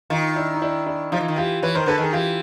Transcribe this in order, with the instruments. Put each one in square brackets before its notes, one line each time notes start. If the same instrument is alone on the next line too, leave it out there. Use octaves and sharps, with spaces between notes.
[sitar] D#3 [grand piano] D#4 F4
[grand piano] D4 E4
D#4
D4 E4
D4 E4
[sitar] F3 [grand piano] D#4 F4
[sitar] E3
D#3
[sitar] E3 [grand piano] F4 G4
[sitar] E3 [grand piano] B4 C#5
[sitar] D#3 [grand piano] A#4 C5
[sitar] D3 [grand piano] A4 B4
[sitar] D#3 [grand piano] G#4 A#4
[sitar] E3 [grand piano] F4 G4